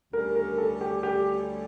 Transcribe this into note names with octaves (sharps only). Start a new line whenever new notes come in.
D2 D3 G3 C#4 A#4
A#4
A4
G4
G4